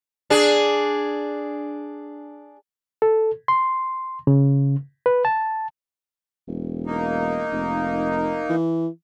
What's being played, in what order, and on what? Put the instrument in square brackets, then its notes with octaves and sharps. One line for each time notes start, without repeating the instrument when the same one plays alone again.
[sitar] D4 G#4
[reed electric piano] A4
C6
C#3
B4
A5
[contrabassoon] E1
[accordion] A#3 D#4
[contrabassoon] F1
E3